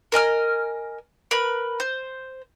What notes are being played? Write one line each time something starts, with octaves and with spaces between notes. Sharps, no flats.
A#4 D#5 G#5 F6
A#4 B4 B5
C5